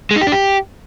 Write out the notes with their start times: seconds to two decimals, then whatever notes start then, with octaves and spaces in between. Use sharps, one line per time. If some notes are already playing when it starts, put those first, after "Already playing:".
0.11 G#3
0.16 D#4
0.21 G4
0.27 D4
0.32 G4